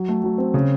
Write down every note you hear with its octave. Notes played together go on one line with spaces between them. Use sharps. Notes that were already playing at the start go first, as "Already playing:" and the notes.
Already playing: F#3
A3
F#3
C4
C#3